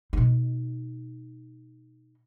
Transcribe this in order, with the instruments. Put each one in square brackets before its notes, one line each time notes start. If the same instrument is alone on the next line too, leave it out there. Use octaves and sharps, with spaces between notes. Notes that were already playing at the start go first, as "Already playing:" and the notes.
[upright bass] B2 D#4